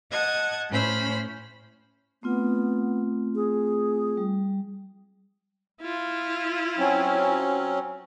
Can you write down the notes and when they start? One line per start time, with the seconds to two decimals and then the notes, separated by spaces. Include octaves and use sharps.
0.10 D#5 F#5 A5 G#6
0.69 A2 C#4 C5 B5 F6
2.23 A3 B3 C4 F4
3.35 G#4
4.17 G3
5.81 E4 F4
6.78 F#3 C4 C#4